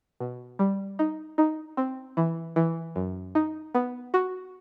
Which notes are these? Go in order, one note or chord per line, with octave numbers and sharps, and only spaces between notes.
B2
G3
D#4
D#4
C4
E3
E3
F#2
D#4
B3
F#4